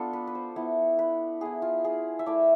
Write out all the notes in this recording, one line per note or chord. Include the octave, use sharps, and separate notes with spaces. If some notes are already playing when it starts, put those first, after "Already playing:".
Already playing: B3 D4 F4 A4
B4
B4
C5
B3 E4
B4
B3 E4 G#4
F4
G#4
E5
A3 E4 D5